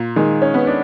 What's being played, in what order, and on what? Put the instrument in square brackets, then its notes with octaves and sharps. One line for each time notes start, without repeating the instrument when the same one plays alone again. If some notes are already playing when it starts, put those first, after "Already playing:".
Already playing: [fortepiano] A#2
[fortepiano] D#3 [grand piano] G#3
[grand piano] C#4
[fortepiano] B3
[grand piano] D4